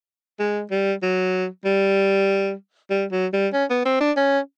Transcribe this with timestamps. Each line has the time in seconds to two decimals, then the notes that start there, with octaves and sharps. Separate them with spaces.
0.40 G#3
0.71 G3
1.03 F#3
1.65 G3
2.91 G3
3.12 F#3
3.33 G3
3.53 C#4
3.70 B3
3.85 C4
4.01 D4
4.17 C#4